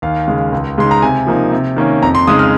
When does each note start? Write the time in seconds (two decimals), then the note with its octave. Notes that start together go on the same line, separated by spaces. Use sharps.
0.02 D#2 F5
0.28 C#3 G#3
0.53 C#2
0.78 C#3 G#3 D#4 C6
0.91 A#5
1.02 C3 G#5
1.27 F3 A#3 D#4
1.52 C3
1.76 D#3 A#3 C#4
2.02 F2 A#5
2.15 C6
2.27 C#3 G#3 D#4 D#6
2.39 F6